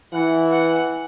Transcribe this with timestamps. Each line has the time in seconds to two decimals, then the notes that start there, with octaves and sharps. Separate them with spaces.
0.13 E3 F#5
0.52 F#5